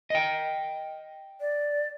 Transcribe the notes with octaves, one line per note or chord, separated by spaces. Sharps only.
D#5 G5
D5